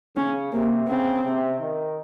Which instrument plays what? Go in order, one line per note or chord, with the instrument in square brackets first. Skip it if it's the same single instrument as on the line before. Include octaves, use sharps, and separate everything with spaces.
[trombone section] C#3 [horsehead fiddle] C#4
[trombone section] C3 [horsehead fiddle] A#3
[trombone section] C#3 [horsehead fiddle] C4
[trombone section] C3
D#3